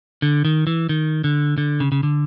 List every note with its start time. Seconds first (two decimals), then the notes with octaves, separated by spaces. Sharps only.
0.22 D3
0.45 D#3
0.67 E3
0.89 D#3
1.24 D3
1.58 D3
1.80 C#3
1.92 C#3
2.03 D3